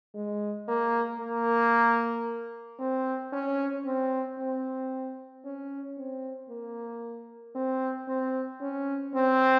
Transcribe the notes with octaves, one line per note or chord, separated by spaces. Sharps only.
G#3
A#3
A#3
C4
C#4
C4
C4
C#4
C4
A#3
C4
C4
C#4
C4